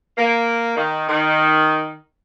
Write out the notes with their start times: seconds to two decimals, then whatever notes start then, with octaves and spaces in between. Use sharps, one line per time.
0.18 A#3
0.76 D#3
1.09 D#3